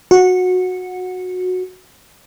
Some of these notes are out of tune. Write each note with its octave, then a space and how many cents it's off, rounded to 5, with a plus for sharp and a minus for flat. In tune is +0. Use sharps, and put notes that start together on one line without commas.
F#4 -15